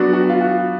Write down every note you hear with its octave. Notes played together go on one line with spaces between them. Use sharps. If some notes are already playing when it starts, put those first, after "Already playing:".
Already playing: F#3 B3 D4 F#4
F#4
F4
F#4